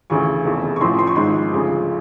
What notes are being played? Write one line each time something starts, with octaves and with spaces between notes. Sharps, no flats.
D2 C#3 E3 C#6
F1 E2 C#3
C#6
A1 A2 F3 C6
C6
C#6
G#1 G#2 F3 C6
D2 C#3 F3